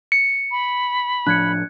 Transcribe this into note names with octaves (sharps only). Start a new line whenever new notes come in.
C#7
B5
A2 F3 D4 F#6 G#6 C#7